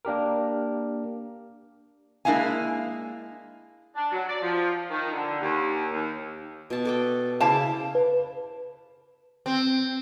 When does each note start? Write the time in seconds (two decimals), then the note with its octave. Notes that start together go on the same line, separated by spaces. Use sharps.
0.05 A#3 D4 G4 A#4
2.25 G#3 A#3 D4 E4 F5 G#5
3.96 D4
4.12 F#3
4.28 D5
4.42 F3
4.90 D#3
5.12 D3
5.40 D#2
5.91 D#2
6.70 B2 A5
6.85 A4 D5 G5
7.40 C#3 E4 C5 F5 A5 D6
7.95 B4
9.46 C4